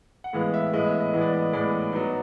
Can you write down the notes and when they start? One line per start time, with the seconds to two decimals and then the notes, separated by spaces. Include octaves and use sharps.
0.24 F#5
0.33 A2 E3 G#3 B3 F5
0.54 E5
0.73 A2 E3 G#3 B3 D#5
0.87 E5
1.00 D#5
1.13 A2 E3 G#3 B3
1.21 D5
1.33 D#5
1.53 A2 E3 G#3 B3 D5
1.93 F#3 B3 D#4